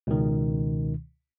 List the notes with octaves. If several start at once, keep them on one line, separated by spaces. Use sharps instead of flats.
C#2 B2 D#3